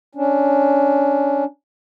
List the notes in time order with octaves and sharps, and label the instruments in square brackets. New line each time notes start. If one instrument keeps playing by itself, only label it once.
[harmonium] C#4 D4